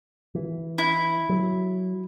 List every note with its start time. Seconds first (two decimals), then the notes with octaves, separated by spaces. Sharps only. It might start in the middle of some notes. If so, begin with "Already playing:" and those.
0.35 E3
0.78 E4
1.29 F#3